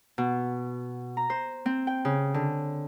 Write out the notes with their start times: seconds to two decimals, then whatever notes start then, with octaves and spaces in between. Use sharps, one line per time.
0.18 B2
1.17 A#5
1.30 C5
1.66 C4
1.87 G5
2.05 C#3
2.34 D3